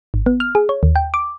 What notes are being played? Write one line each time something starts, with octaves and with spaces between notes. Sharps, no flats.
G#1
B3
F6
G#4
C#5
D#2
G5
D6